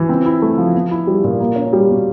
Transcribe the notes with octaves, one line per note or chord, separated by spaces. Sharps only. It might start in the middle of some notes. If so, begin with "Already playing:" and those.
Already playing: E3
C4
E4
A3
F3
B3
E4
G3
A#2
A#3
C#4
G3
B2